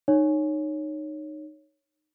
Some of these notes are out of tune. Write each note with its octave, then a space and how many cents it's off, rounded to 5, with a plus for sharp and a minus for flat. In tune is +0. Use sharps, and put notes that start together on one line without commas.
D#4 -20 C#5 +0